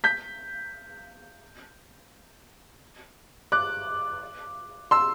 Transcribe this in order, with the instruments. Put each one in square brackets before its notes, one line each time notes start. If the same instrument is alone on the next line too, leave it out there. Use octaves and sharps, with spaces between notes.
[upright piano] G6 B6
D6 F#6
C6 E6